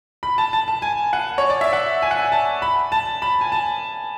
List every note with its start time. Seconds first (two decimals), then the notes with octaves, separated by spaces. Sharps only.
0.23 B5
0.38 A5
0.53 A5
0.68 A5
0.82 G#5
1.13 F#5
1.38 C#5
1.50 D5
1.61 E5
1.73 F#5
2.02 G#5
2.11 F#5
2.19 G#5
2.32 A5
2.62 B5
2.92 A5
3.22 B5
3.41 G#5
3.52 A5